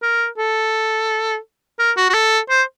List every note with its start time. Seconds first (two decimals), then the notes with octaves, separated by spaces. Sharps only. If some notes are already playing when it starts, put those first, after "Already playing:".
0.02 A#4
0.38 A4
1.79 A#4
1.97 F#4
2.10 F#4
2.14 A4
2.50 C5